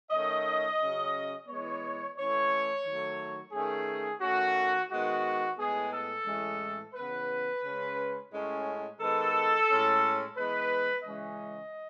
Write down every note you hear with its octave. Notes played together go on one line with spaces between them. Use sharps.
D#3 A3 C#4 D#5
C#3 F#3 C#4
E3 G#3 B3 C#5
E3 A3 C#4 C#5
D#3 F#3 A3
D#3 A3 C#4 G#4
D#3 A3 C#4 F#4
D#3 G#3 B3 F#4
A2 G#3 B3 G#4
A4
A2 E3 G#3 C#4
C#3 E3 B3 B4
C#3 G#3 C#4
A2 G#3 C#4
D#3 G#3 B3 A4
A2 G#3 C#4
E3 G#3 B3 B4
C#3 E3 G#3 C#4 D#5